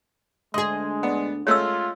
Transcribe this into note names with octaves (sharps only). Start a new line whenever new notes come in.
D2 G#3 G#4 D#5 C6
B3 D4
G#3 A3 C#4 F4 C#5 E6